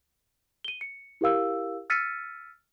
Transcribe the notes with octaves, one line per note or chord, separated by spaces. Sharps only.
D#7 G7
C#7
E4 G4 A#4 F5 E6
E6 F6 A6 B6 C#7 D#7